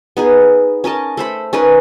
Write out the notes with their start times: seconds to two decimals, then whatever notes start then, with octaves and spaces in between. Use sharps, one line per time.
0.17 B3 D#4 G#4
0.84 C#4 A#4 D#5 A5
1.17 A3 C5 B5
1.53 C#4 D#4 A#4 B4